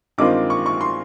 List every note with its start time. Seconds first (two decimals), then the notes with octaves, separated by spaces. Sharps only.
0.18 G2 D#3 G#3 C4 F4 D6
0.50 C#6
0.66 C#6
0.81 C6